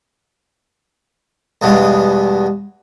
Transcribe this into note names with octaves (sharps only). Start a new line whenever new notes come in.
E2 G2 B2 G#3